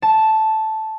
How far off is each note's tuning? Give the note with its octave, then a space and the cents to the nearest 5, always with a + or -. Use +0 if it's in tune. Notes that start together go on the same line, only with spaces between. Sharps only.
A5 -5